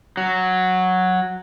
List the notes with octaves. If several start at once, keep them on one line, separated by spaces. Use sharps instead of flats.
F#3